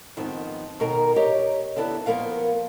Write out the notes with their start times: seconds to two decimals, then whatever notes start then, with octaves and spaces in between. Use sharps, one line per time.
0.17 G#2 D#3 F3 B3 C4
0.79 D#2 B2 D#3 A#4 A#5
1.16 G4 C#5 D#5
1.76 D3 B3 D4 E4 B4
2.06 F3 A#3 B3 A#4 F5